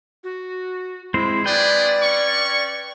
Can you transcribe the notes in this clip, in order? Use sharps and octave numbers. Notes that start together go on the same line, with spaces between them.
F#4
G#3 C4 E4 C5
D4 E4 G#4 B4 D5 G5
C#4 C#6